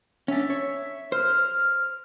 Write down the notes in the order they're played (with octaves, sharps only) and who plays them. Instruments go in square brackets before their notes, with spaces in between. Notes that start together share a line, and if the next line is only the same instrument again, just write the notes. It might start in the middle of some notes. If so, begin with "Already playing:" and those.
[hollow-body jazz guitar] C#4 D4 [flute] E5
[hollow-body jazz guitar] C#5
[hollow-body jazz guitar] C5 [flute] F6